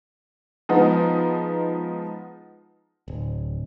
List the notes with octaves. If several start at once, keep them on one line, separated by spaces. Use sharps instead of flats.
F3 G#3 B3 D#4
D1